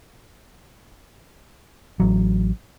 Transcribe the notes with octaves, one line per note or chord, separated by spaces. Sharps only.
A1 F#3